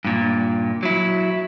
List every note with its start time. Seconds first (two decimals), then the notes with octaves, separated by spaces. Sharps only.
0.05 G2 A#2
0.83 F#3 E4